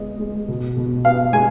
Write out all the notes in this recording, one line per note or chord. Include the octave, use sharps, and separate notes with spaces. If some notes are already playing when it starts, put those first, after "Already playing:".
Already playing: G#3 B3 D#5
G#3
B2
B2
B3 F5
G#3 G#5